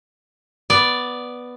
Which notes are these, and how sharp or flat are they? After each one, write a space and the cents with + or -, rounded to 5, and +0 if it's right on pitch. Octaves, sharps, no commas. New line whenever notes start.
B3 +0 D5 +0